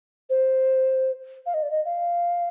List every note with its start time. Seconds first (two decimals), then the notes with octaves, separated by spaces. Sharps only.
0.30 C5
1.46 F5
1.54 D#5
1.63 D5
1.71 D#5
1.85 F5